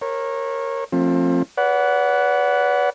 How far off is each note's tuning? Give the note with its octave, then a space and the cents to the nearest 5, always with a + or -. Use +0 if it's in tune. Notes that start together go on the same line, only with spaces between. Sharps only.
A#4 +0 C#5 -25
F3 +5 A3 +35 C4 +30
B4 +0 D5 -45 F#5 +0